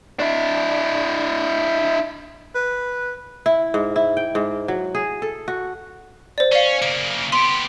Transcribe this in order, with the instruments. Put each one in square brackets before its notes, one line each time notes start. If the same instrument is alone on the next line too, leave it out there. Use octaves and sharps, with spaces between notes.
[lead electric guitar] D4 E4
[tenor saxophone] B4
[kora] E4
G#2
E4
G5
G#2
F#3
G#4
A4
F#4
[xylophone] C5 D5
[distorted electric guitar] C#4 [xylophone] D5 F5
[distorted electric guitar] C#3 A#3 [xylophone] C#7
[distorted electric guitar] B3 G4 [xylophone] C6